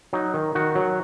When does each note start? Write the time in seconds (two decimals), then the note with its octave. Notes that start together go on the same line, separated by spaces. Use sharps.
0.13 F#3 D#4
0.34 D#3
0.55 D#3 F#4
0.75 F#3